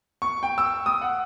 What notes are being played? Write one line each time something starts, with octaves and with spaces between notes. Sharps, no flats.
C#6
G5
E6
D#6
F#5